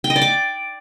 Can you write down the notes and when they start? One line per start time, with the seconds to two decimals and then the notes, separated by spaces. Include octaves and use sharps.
0.04 G5
0.10 D#5
0.16 D5
0.22 D6